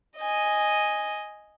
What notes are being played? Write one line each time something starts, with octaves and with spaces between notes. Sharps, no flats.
D#5 G#5